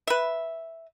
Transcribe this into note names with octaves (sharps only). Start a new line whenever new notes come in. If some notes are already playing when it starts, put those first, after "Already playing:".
B4 E5